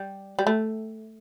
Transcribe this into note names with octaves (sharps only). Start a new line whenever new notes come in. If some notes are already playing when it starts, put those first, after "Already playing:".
Already playing: G3
G3
A3